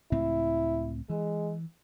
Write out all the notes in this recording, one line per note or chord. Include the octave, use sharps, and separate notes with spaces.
C#2 A2 C4 E4
E3 G#3